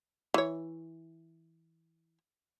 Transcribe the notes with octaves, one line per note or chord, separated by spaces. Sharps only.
E3 C#5